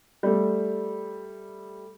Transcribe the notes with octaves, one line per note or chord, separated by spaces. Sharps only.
G3 A3